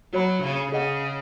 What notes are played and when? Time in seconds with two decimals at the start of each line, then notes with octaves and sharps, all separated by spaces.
0.13 F#3 F#4 C#5 B5
0.42 C#3
0.72 C#3 G#4 D#5 F#5